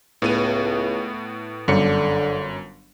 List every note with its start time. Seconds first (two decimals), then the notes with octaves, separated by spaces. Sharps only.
0.22 C#2 A2 B3 D#7
1.68 G1 F#2 D3 C#7